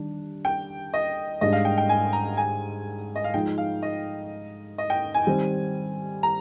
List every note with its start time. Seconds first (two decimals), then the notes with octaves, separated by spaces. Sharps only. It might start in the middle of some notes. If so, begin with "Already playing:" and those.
Already playing: D#3 G3 D4
0.45 G5
0.94 D#5
1.41 G#2 G3 D4 D#5
1.53 F5
1.65 G5
1.78 G5
1.89 G#5
2.13 A#5
2.37 G#5
3.16 D#5
3.24 F5
3.34 F3 G#3 D#4 G5
3.58 F5
3.82 D#5
4.78 D#5
4.90 G5
5.14 G#5
5.26 D#3 G3 C4
6.23 A#5